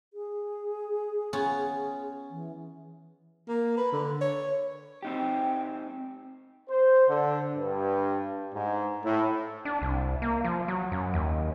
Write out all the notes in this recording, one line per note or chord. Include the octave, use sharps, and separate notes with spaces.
G#4
B3 C#4 F4
E3
A#3
B4
D3
C#5
C4 D#4 G4 G5
C5
D3
G2
G#2
A2
D4
C2
A#3
F3
F#3
F#2
D#2